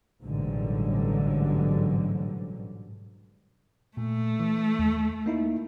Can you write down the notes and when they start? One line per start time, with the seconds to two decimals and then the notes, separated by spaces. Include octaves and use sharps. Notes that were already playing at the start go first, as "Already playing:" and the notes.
0.22 A1 G#2 B2 D3 F#3 G3
3.97 A#2 A3
4.40 E3
4.79 D#2
5.26 A#3 D#4 E4